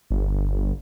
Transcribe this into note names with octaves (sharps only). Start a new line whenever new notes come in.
G1